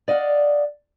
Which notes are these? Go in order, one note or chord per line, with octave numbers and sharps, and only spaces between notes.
D5 D#5 F5 F#5